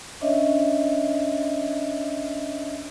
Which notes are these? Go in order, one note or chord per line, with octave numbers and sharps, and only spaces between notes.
C#4 D4 C#5 D#5 E5